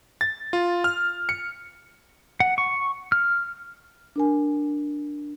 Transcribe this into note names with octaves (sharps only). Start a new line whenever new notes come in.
A6
F4
F6
C#7
F#5
C#6
F6
D4 A#4 G#5